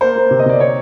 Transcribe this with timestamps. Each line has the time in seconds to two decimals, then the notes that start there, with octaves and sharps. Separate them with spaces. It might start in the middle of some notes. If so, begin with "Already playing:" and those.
0.01 A#3 C5
0.16 A#3
0.31 C3
0.39 D#5
0.46 C3 D5
0.60 C#5